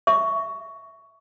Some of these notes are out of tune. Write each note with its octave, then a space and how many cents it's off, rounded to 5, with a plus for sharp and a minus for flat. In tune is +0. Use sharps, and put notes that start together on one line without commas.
E5 +0 C#6 +15